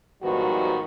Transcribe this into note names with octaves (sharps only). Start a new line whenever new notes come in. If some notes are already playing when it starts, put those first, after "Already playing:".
G#2 D#3 F3 G3 B3 F#4